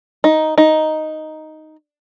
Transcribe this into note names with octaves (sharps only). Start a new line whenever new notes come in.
D#4
D#4